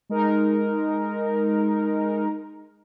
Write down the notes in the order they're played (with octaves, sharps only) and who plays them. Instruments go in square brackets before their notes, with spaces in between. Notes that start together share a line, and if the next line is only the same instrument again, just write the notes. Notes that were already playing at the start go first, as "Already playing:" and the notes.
[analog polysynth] G#3 D#4 A#4